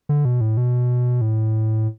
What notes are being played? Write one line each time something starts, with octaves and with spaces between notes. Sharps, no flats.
D3
B2
A2
B2
A2